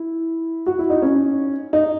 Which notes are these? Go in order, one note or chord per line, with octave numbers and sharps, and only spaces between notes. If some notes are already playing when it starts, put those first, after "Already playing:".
Already playing: E4
F#4
E4
D#4
C#4
D#4